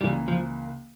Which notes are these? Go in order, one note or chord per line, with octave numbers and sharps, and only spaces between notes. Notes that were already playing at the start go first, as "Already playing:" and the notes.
C#2 C#3 E3 G3 A#3
F3